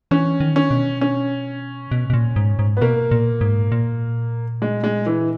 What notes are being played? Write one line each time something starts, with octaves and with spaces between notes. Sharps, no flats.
E3 C#4
D#3
C#4
B2
C#4
B2
B2
A#2
G#2
G#2
B3
B2 A#3
A#2
G#2
A#2
G#3
G#3
E3